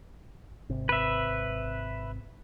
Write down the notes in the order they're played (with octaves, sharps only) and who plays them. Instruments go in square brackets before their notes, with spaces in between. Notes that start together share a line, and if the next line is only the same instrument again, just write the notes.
[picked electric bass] G#1 C3
[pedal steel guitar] B4 E5